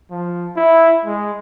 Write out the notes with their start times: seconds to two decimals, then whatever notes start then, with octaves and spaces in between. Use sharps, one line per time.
0.11 F3
0.57 E4
1.05 G#3